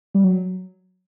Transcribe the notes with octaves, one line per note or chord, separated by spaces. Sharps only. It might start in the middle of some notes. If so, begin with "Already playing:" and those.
G3
F#3